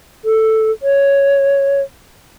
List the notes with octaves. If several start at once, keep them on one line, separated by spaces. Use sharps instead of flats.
A4
C#5